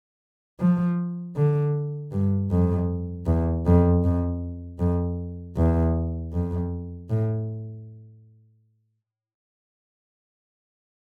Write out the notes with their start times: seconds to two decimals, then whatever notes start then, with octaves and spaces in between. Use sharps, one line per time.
0.60 F3
1.36 D3
2.12 G2
2.51 F2
3.27 E2
3.66 F2
4.04 F2
4.79 F2
5.57 E2
6.33 F2
7.10 A2